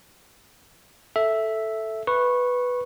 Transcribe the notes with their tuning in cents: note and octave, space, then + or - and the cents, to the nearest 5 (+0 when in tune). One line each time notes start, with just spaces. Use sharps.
A4 +0 E5 +0
B4 +0 C#6 -20